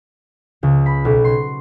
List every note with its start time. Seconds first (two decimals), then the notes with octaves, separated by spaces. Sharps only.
0.63 C#2
0.86 B5
1.05 B1
1.24 C6